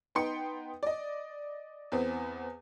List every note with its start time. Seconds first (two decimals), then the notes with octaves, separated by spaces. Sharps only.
0.15 B3 D#4 G5 C6 C#7
0.83 D5 D#5
1.92 E2 B3 C4